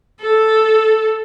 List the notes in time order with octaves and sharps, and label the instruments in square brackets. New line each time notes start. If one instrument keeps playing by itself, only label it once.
[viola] A4